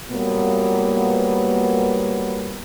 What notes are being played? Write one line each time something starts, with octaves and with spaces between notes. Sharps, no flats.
A#2 F#3 G3 A#3 B3